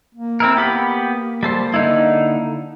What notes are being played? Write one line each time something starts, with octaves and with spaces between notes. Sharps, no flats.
A#3
C4 E4 A#4
B3 G4 B5
G3 A4 C5
D3 D#4 E4